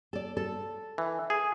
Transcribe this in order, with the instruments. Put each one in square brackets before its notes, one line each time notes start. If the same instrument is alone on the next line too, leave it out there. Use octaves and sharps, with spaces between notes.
[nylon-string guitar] A4 D5
A4
[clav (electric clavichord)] E3
G#4